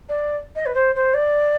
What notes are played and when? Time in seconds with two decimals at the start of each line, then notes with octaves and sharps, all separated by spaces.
0.09 D5
0.55 D#5
0.65 B4
0.74 C5
0.95 C5
1.14 D5